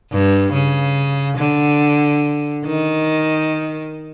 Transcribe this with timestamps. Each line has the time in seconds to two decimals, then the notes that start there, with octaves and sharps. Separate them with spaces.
0.12 G2
0.53 C#3
1.37 D3
2.65 D#3